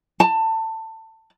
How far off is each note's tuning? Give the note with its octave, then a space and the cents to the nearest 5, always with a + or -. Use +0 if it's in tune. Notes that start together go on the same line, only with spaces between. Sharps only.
A5 +20